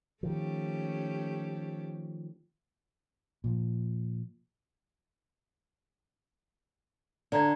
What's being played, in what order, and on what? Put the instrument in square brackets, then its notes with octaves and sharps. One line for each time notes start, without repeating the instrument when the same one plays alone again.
[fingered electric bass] D#3 F3 [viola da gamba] A3 C#4 G4
[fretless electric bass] A#2 F3
[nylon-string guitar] D3 [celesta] D5 A#5 G#6